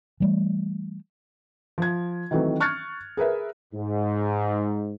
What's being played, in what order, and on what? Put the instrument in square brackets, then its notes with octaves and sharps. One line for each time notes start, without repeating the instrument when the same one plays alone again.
[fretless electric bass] E3 G3 A3
[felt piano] F3 G#6
D#3 E3 F#3 A3 C4
C#6 F6 F#6 G#6 A6 C#7
G#4 A#4 B4 E5
[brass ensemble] G#2